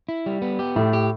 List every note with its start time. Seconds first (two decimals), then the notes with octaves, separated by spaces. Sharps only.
0.09 E4
0.26 G3
0.42 B3
0.59 G4
0.76 A2 A3
0.93 G4